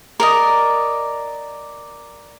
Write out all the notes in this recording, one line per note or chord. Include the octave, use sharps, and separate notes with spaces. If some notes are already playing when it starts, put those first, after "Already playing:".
A#4 D5 D#5